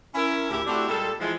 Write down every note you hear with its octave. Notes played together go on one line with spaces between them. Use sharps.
C#4 E4 A#4
D2 A2 C#3 E4 G4
A3 C4 D4 E4 F#4 G4
A#2 G3 G#3 A4
E3 F3 G#3